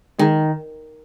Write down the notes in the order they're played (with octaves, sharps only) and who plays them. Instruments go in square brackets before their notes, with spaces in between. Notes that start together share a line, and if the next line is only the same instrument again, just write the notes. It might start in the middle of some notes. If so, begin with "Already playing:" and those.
[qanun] D#3 [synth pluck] G#3 D#4 G#4